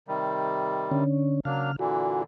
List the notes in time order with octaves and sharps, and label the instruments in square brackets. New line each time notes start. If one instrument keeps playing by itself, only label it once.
[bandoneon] C3 D#3 G3
[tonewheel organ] D3 C#4
[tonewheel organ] C#3 F6 [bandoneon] F#3 A#3 D4
[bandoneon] A#2 D3 E3 [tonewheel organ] F#4